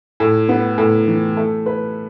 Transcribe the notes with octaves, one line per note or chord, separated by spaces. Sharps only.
A2
B3
A2
E3
A3
B4